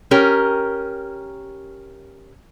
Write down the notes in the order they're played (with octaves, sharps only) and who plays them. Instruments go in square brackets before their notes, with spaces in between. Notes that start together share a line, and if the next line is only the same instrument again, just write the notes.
[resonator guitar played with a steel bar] C#4 G4 A#4